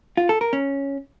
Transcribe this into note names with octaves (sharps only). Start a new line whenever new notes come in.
F4
A4
A#4
C#4